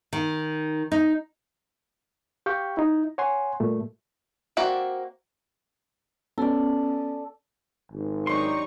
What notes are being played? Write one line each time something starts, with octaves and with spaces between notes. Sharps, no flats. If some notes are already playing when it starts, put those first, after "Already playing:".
D#3
D#4
G4 F5 G5 C#6 G6
D#4 E4
C#5 F#5 G#5 C6
A#2 G3 A3
A#3 C4 F#4 D5 E5
B3 C#4 A4 D5
G#1
F#3 D4 D#4 G4 D5 C6 C#6